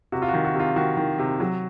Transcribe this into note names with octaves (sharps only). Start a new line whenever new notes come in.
C3 F#4
F4
F#4
D#3
F#4
C3 F4
D#3 F#4
D#3
C3
F#3